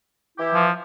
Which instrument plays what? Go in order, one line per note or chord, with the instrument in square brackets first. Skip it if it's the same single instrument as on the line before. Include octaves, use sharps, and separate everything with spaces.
[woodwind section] E3 E4 G4
[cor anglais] F3